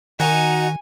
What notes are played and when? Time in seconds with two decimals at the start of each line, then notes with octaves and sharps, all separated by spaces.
0.20 D#3 D#4 F#4 F#5 G#5 A#5